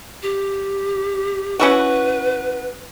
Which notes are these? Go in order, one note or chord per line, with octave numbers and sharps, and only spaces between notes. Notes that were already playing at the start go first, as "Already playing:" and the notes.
G4
C#4 E4 F#4 B4